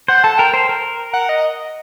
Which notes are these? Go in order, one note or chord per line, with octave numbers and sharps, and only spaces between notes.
C5 F#5
A4 A5
A#4 G5
C5
A#4
F#5
D#5